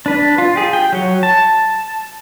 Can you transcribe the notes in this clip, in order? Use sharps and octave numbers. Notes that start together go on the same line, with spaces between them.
D4 B4
F4
G4 G#4
G5
F#3 C#5
A5